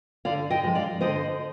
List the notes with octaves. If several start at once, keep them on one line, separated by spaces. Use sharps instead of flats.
D3 D5 F5
D#5 G5
F3 G#3
D5 F5
D3 C5 D#5